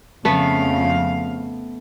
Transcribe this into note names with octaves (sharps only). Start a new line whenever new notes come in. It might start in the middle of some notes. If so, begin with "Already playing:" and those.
F2 C#3 A3 B3 F5